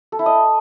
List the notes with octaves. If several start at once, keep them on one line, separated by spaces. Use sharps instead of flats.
A4
E4
D#5